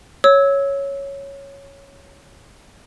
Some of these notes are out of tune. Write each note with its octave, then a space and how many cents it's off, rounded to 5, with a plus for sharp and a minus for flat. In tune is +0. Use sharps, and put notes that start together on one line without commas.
C#5 +0 E6 -20